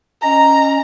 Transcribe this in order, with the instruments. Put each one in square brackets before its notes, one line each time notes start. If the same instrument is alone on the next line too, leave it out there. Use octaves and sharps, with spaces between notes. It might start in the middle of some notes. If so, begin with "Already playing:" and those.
[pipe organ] C#4 D#5 [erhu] A#5